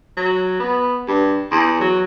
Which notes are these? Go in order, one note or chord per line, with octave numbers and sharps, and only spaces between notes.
F#3
B3
G2
E2
F#3